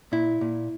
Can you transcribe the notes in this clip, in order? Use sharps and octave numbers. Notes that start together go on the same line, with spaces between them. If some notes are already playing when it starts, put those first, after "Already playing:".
A#2 E4
A#2